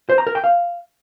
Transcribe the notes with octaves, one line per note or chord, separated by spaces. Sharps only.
C5
A#5
A#4
G5
F5